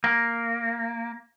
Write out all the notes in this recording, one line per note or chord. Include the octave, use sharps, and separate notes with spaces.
A#3